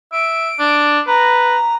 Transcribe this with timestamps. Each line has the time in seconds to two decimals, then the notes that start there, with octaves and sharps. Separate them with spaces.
0.12 E5 D7
0.60 D4
1.07 B4 A#5